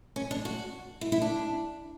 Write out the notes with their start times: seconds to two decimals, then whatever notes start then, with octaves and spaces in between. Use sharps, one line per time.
0.16 C#4
0.31 D4
0.45 F#4
1.01 E4
1.12 E4
1.22 D4